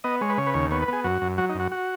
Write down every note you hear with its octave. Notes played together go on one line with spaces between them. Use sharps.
B3 D#5
G#3 C#5
B4
C#3 C#5
B4
D#2 C#5
B3 C#5
B4
B3 G#4
F#2 F#4
F#2
F#3 F#4
D#4
F#2
F#4
F#4